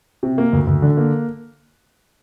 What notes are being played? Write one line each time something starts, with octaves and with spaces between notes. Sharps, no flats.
C3
A#3
D2
D2
D3
A#3